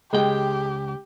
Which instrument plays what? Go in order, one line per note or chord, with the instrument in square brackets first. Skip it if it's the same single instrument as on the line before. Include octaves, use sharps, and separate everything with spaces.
[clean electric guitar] C#2 G5 [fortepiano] G#3 [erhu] G4